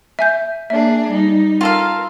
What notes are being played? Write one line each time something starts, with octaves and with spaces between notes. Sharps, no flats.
E5 G#5 G6
A#3 D4 G#4 E5
G3 D#4
F4 A4 A#4 F5